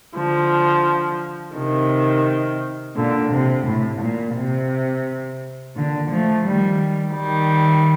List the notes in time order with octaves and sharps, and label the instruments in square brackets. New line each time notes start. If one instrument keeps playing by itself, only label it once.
[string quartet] D3 F3
C3 D#3
A#2 D3
C3
A2
A#2
C3
A#2 D3
F3 A3
D#3 G3
D#3 G3